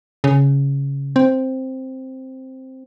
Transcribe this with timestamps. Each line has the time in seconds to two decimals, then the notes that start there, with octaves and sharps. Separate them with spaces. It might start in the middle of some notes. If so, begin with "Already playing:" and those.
0.24 C#3
1.16 C4